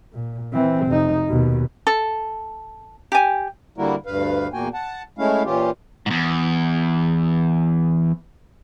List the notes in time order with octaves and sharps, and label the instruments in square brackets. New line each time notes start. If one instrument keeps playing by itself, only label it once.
[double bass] A#2
E3 C4
F1 D#4
D#2 B2
[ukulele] A4
G4 G#5
[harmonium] D3 G3 A#3 E4 F#4 A#4
D2 G2 B4 F5
E2 A#2 A#3 F#4 G5 G#5
F#5 A5
G#3 A3 C#4 E4 F5
A#2 E3 C#4 F4 G4
[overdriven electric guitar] E2 G#2